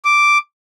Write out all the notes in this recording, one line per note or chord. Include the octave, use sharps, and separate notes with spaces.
D6